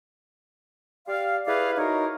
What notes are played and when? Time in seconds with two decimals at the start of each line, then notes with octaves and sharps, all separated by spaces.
1.08 G4 D5 F5
1.46 E4 G#4 B4 D5 F5
1.77 D#4 F#4 A#4 C#5